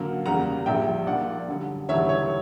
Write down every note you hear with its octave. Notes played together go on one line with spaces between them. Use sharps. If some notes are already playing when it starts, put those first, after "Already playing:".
Already playing: F#2 D3 F#3 A#3
E2 C#3 G3 A#3 F#5 A#5
A#1 A#2 G3 E5 G5
A#1 A#2 A#3 D5 F#5
F#2 D3 G3
E1 D2 C#3 E3 G3 C#5 E5
C#5